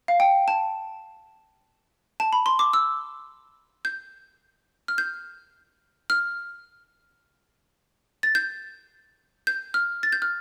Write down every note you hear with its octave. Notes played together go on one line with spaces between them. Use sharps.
F5
G5
A5
A5
B5
C6
D6
E6
G6
F6
G6
F6
A6
G6
G6
F6
A6
G6
F6